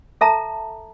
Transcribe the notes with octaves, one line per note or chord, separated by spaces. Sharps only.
A4 E5 A5 A#5